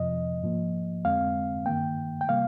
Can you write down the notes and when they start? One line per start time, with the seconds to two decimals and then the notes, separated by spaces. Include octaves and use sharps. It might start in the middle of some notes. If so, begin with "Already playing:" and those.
Already playing: F2 C3 F3 D#5
0.43 G#2 F3 A#3
1.04 F2 D3 G#3 C4 F5
1.66 G2 D#3 A#3 G5
2.21 G5
2.29 C3 G3 A#3 F5